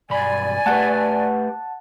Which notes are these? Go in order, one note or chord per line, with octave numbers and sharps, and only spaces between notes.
B1 G2 D5 G#5 B5
A3 G4 B4 F#5 A5